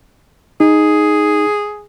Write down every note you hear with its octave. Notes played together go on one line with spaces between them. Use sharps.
D#4 G#4